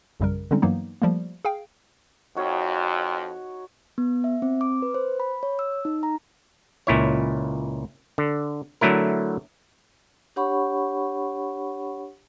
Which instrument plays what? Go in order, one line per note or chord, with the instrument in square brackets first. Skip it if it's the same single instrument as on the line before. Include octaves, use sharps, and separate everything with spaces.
[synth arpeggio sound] A#1 F#2 C#3 G3 A#4
D3 G3 G#3 C4 C#4 D#4
G2 E3 F#3 A#3 B3 D#4
F3 G3 A3 A#3
G#4 F5 G5
[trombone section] F2 [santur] D#4 F#4 C#5
[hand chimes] B3
E5
C4
D6
B4
C5
B5
C#5
E6
D#4
A#5
[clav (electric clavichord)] C#2 A#2 E4 C#5
D3
D3 F#3 A3 E4 A#4
[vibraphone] D4 G4 C#5 F#5 B5 C#6